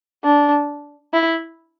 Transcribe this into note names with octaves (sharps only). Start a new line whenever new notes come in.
D4
E4